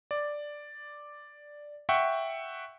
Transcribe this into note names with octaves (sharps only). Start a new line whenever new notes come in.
D5
E5 F#5 G5 C#6